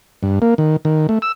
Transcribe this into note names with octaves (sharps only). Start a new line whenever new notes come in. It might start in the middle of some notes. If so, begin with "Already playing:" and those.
G2
A#3
D#3
D#3
A3
E6